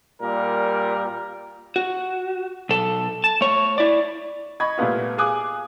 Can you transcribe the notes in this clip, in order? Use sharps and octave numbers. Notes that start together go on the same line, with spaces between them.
A#2 G3 A#4
F#4
B1 A4
A5
A3 C#5
E4 D5
D#5 B5 C#6 G#6
A#2 G3 A3 B3 F4
G#4 F5 G#5 D6 D#6 F#6